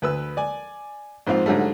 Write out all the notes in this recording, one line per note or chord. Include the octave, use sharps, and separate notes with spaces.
D2 B4 E6
D5 G#5
A#1 G#2 C4 F4 F5
G#2 D3 F#3 G3 A3